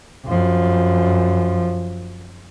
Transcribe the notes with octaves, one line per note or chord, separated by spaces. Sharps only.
F#2 F3